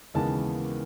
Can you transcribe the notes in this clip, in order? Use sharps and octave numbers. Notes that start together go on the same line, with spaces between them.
D#2 C#3 E3 G#3 B3 A5